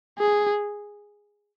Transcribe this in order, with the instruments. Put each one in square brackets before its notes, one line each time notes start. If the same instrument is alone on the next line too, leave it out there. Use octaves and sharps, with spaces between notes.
[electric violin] G#4